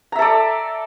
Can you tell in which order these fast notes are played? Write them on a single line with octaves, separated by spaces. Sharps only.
A#5 E5 A4 D5